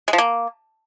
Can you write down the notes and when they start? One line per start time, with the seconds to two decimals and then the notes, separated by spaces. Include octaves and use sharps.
0.08 G#3
0.13 F3
0.18 A#3